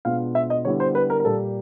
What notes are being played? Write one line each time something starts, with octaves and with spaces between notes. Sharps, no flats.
B2 G#3 B3 D4 F4 F5
E5
D#5
D3 G3 B3 E4 C#5
C5
B4
A#4
A#4
A#2 G3 A#3 A4